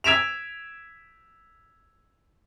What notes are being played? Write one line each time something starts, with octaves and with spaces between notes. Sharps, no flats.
E6 G#6 B6 D7 E7 F7